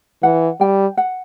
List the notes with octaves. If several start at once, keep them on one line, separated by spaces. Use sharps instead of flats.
E3 F#5
G3 G5
F#5